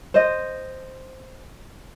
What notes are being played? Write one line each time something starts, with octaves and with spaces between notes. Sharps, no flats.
C5 D#5